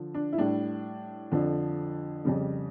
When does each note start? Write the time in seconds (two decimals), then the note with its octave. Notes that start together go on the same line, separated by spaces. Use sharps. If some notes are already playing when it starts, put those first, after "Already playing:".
Already playing: D3 F3
0.14 D4
0.33 E4
0.38 A2 G3 D4
1.32 F2 D3 F3
2.25 F2 C#3 G3